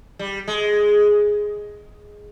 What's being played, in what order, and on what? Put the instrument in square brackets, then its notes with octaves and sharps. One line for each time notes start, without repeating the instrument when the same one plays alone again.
[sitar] G3
G#3